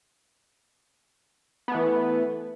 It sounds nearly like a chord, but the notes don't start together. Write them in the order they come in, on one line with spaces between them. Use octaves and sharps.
B3 A3 E3